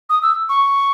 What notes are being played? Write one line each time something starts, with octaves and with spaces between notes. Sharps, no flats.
D#6
E6
C#6